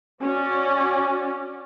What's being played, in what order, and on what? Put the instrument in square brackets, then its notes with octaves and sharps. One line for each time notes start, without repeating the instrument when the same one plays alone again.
[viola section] C#4 F#4 D5